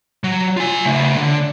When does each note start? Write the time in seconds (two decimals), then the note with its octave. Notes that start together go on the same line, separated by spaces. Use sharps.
0.24 F#3
0.57 F4 G#5
0.85 C#3 A3
1.16 D3